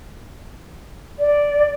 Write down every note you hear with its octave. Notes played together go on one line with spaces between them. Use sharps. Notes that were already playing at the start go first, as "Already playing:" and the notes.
D5